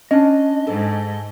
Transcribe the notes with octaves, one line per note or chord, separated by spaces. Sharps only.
C#4 D4 D#5
G#2 A4